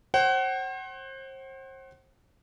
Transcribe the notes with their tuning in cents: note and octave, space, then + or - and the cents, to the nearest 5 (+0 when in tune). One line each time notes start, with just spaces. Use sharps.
C5 +35 F#5 +35